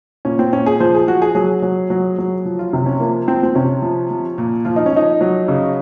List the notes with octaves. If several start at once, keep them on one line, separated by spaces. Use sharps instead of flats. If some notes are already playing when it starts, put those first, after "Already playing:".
A#2 C#4
C4
A#2 C#4
G#4
F3 C5
G#4
F3 F#4
G#4
F#3 G#4
F#3
F#3
F#3
F3
F4
C3
C#4
F3 A#3
F3 C4
C4
C3 C#4
F3
F3
A#2
F3 F4
D#4
C#4
F3 D#4
F#3
C#3